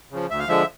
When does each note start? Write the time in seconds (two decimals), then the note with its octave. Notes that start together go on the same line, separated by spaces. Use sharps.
0.11 C#3 F3
0.29 D2 E5
0.39 F5
0.48 D3 F3 G#3 E5